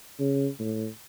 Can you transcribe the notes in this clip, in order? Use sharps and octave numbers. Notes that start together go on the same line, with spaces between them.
C#3
A2